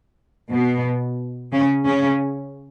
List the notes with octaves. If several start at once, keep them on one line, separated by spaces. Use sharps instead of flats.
B2 B3
C#3 C#4
C#3 C#4